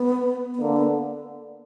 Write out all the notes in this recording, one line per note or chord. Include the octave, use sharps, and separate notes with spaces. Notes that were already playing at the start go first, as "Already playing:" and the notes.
Already playing: B3
B3
D3 A#3
B3